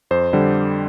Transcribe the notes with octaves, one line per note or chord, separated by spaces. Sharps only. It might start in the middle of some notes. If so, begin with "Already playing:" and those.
F2 C5
D3 G3